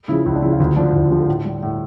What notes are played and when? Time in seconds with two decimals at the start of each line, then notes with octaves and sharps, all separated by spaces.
0.08 C#3 F3 E4
0.26 C#2 E4
0.35 D4
0.42 C#3 F3 E4
0.52 F4
0.59 D2 E4
0.76 D3 F3 D4
0.93 D2 E4
1.02 F4
1.11 D3 F3 G4
1.20 A4
1.27 A2
1.44 G3
1.63 A2